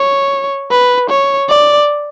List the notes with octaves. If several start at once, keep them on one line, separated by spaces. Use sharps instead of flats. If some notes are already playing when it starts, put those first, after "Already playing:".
Already playing: C#5
B4
C#5
D5